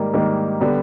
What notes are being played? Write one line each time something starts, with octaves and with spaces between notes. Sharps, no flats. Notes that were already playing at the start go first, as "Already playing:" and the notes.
Already playing: G#2 D#3 G3 A#3
G#2 D#3 G3 A#3
D3 G3 B3